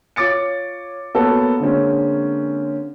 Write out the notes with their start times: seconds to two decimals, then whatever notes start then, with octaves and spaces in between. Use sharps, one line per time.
0.16 F4 C#5 D6 A6 C#7
1.14 A#3 B3 F#4 A4 B4 C#5
1.60 D3 G#3 A#3 C4 C#4